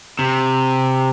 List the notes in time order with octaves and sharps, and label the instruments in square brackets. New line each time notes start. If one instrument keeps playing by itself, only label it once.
[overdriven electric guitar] C3